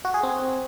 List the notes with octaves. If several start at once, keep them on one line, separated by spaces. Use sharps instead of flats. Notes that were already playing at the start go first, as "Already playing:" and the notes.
F#4
G#4
C4